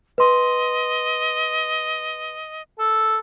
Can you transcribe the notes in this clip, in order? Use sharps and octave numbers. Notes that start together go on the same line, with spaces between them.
B4 D#5 C6
A4